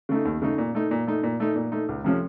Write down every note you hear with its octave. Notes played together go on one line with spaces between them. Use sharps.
C#3 A3 D#4
D#2
C#3 A3 D#4
A#2
A3 D#4
A#2
A3 D#4
A#2
A3 D#4
A#2
A3 D#4
C#2
C3 F3 A3 C#4